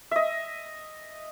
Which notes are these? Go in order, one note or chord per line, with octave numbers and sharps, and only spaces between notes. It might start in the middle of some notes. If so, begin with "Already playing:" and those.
D#5 E5